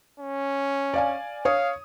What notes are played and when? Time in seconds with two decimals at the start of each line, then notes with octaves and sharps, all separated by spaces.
0.20 C#4
0.94 D5 F5 G#5
1.45 C#5 F5 D#6